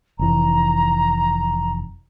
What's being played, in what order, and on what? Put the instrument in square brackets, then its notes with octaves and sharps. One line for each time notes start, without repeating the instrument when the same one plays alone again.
[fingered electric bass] F1 E3 [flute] A#5